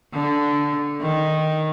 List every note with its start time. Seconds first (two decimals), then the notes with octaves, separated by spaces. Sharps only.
0.14 D3
1.01 D#3